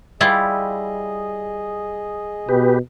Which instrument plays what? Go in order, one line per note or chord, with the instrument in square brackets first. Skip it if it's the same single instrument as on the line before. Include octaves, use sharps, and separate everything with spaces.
[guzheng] G3 E4 F4 [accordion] G#4 D#5
[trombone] B2 [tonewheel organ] G4 B4